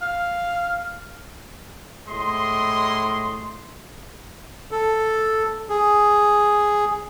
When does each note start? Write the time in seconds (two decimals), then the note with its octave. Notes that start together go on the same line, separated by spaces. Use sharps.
0.02 F5
2.08 A2 G#3 D#5 C6
4.71 A4
5.69 G#4